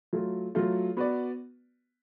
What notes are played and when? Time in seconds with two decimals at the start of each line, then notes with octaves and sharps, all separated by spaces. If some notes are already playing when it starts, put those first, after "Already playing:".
0.13 F#3 A3 F4
0.55 F#3 A3 F4
0.97 B3 F#4 B4 D5